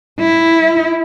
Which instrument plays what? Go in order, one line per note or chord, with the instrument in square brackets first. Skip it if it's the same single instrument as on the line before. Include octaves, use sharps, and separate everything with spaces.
[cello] E4